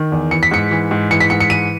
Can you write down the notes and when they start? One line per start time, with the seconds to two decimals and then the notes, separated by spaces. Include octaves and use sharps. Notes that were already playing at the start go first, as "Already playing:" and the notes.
Already playing: D#3
0.12 E2
0.31 E3 C#7
0.43 B6
0.51 G#2 C#7
0.71 E3
0.91 G#2
1.10 E3 C#7
1.20 B6
1.30 G#2 C#7
1.40 C#7
1.50 E3 D#7